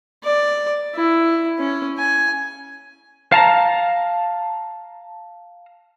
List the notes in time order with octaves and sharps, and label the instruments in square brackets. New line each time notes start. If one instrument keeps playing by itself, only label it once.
[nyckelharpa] D5
E4
C#4
G#5
[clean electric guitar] F5 A5 A#5